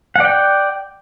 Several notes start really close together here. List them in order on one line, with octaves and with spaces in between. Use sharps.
F#5 D5 G5